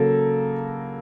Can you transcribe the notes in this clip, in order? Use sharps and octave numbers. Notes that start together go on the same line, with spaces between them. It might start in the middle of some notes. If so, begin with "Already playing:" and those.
Already playing: C#3 F#3 A#3 A4